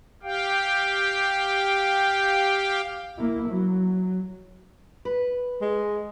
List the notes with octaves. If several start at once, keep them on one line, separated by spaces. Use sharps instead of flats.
G4 F5 G5
A#3 E4
F#3
B4
G#3